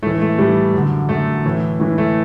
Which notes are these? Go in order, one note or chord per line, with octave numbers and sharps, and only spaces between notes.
A2 E3 A3
A3
A2 E3 G3
F#2 D3
F#2 D3 A3
A2 E3
A2 E3
A3